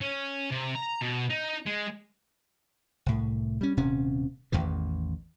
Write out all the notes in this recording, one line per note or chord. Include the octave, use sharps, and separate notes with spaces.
C#4
C3
A#5
B2
D#4
G#3
C2 A2
G3 C#4
D#1 C3 C#4
A1 E2 D#3 E3